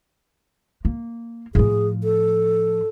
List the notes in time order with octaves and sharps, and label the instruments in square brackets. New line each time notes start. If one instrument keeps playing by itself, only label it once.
[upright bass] A#3
[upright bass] A2 F3 [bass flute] G#4
[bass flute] A4